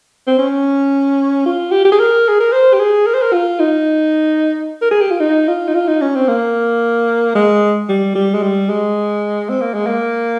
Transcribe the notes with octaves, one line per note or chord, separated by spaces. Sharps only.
C4
C#4
F4
G4
G4
G#4
A#4
G#4
A#4
C5
G4
G#4
A#4
C5
A#4
F4
D#4
A#4
G#4
G4
F4
D#4
F4
D#4
F4
D#4
C#4
C4
A#3
G#3
G3
G3
G#3
G3
G#3
C4
A#3
G#3
A#3